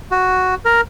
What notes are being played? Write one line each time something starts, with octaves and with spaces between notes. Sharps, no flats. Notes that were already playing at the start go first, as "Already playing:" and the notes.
F#4
A#4